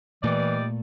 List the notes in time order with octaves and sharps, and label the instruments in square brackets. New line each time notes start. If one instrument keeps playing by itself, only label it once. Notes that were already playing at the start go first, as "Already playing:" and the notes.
[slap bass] A#2 A3 [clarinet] E3 [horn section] G3 D#4 D5